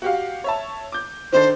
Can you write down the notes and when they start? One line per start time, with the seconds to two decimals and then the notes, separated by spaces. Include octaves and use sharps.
0.02 F#4 G4 F5
0.44 C#5 E5 A5
0.92 D6 G6
1.32 D#3 D4 A4 C5